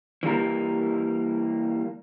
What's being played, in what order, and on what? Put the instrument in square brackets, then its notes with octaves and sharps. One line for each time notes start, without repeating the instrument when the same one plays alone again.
[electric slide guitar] E3 G3 A#3 A#4